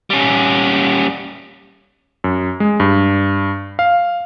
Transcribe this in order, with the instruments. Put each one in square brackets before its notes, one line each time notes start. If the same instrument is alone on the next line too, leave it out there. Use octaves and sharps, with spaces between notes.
[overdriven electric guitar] G3 C#4
[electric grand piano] F#2
G#3
G2
F5